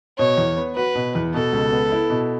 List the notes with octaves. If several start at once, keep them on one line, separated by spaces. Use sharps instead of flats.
B2 C#5
E2
B3
F#4 B4
B2
E2
B2 A4
C#2
B3
E4
B2